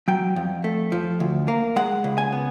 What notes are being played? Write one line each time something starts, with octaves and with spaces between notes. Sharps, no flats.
F#3 G5
F2
A3
F3
D2
A#3
G#3 F#5
C#2
G#5
B3